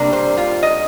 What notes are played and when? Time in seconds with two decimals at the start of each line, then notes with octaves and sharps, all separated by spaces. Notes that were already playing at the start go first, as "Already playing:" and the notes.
Already playing: C3 G3 A#3 D4
0.13 C5
0.37 F4
0.63 D#5